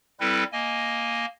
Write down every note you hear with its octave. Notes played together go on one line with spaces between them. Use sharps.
G3 C4 E4 A4 B4
A#3 D#5 G#5